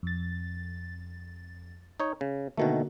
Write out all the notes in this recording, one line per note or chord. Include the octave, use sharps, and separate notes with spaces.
F2 A6
D#4 C#5
C#3
B2 D3 D#3 A3 A#3 F#4